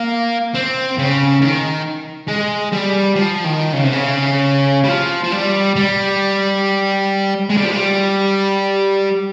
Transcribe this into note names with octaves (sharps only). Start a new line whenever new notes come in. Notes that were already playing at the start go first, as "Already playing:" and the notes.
Already playing: A#3
C4
C#3
D#3
G#3
G3
F3
D#3
C#3
C3
C#3
G3
F3
F3
G3
G3
G#3
G3
F3
G3